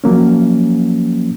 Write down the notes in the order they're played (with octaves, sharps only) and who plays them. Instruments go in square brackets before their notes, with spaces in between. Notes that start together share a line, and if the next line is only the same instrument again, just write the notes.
[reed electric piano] F3 F#3 A#3 C#4